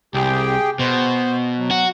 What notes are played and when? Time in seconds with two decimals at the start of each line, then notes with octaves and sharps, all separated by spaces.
0.14 C2 G4 G#4 G5
0.79 B2 C5
1.58 F#3
1.71 F#4